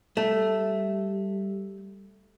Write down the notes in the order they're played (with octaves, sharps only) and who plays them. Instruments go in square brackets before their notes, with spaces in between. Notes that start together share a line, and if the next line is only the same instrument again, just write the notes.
[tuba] G3 [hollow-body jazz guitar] A3